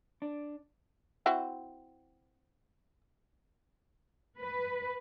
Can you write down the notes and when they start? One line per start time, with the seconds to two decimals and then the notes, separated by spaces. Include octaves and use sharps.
0.22 D4
1.26 C4 E4 F#4
4.38 B4